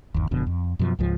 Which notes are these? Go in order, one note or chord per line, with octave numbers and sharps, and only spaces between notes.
G1 D#2
E1 F2 B2 D3
F2
F#2 B2 F3
C#2 G#2 F3